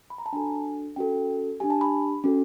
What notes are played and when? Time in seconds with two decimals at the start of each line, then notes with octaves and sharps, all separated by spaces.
0.10 B5
0.18 A#5
0.26 A5
0.33 D4 F#4 A4 G#5
0.96 C#4 F#4 A4 G5
1.60 D4 G4 G#5
1.70 A5
1.81 B5
2.24 C#4 F#4 A4